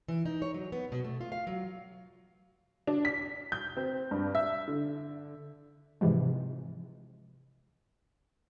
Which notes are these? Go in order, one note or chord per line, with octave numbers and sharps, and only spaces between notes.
E3
D#4
C#5
F#3
B3
B2
A3
F4
F5
F#3
D4
B6
G6
C4
G2
E5
D3
G#2 C3 E3 F3 G#3